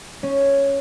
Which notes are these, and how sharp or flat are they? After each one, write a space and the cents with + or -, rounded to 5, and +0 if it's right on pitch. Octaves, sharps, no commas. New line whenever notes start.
C#4 +0